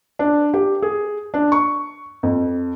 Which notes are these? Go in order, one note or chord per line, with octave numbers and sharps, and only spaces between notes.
D4
G4
G#4
D4
C#6
F2